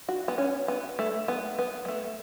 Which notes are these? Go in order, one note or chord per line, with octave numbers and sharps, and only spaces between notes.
F#4
B3
C#4
B3
A3
B3
B3
G#3
A3